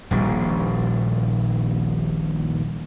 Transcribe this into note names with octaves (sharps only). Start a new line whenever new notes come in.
D#1 A#1 G3